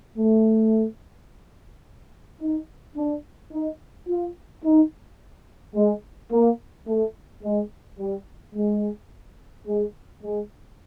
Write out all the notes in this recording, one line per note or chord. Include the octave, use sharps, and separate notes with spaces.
A3
D#4
D4
D#4
F4
D#4
G#3
A#3
A3
G#3
G3
G#3
G#3
G#3